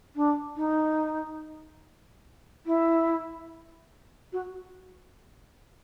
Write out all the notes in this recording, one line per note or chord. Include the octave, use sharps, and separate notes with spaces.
D4
D#4
E4
F#4